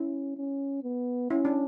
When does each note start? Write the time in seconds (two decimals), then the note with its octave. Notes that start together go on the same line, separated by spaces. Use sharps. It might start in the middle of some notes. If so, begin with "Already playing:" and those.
Already playing: C#4 E4
0.37 C#4
0.83 B3
1.30 C#4 E4
1.45 D4